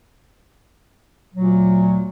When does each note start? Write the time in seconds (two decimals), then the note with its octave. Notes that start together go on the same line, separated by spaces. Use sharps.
1.34 D2 A#2 F#3